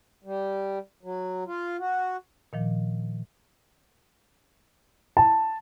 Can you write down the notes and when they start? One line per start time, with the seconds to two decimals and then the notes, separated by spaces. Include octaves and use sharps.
0.24 G3
1.03 F#3
1.47 F4
1.79 F#4
2.53 A#2 D#3 F3
5.17 A5